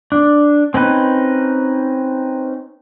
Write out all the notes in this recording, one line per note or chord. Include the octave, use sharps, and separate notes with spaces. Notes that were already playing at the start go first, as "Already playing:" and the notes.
D4
C4 C#4 D#4 B4